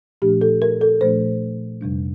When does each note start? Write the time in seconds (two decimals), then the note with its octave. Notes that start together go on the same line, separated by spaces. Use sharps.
0.22 A#2 F3 A3 D4 G4
0.41 A4
0.62 A#4
0.81 A4
1.01 A#2 F3 A3 D4 C5
1.81 F2 C3 G3 D4